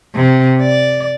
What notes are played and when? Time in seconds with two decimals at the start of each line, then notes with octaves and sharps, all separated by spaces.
0.15 C3
0.61 D5